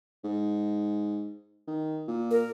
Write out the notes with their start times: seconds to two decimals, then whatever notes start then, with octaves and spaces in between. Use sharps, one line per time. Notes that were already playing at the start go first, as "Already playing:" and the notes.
0.24 G#2
1.67 D#3
2.08 A#2
2.31 A#4